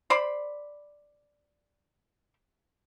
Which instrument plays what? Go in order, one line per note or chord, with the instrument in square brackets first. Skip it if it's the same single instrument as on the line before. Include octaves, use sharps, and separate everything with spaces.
[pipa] C5 D5 B5